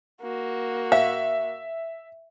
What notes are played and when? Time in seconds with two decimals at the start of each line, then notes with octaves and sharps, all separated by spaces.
0.22 A#3 F#4
0.92 E5 F5